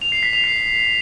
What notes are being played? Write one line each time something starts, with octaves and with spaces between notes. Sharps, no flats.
F7
C7
B6
F7
C7